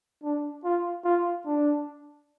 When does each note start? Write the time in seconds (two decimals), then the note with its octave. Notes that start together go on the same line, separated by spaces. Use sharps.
0.23 D4
0.64 F4
1.04 F4
1.46 D4